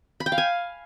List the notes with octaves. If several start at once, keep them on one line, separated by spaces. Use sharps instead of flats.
B5
G5
F5
G#5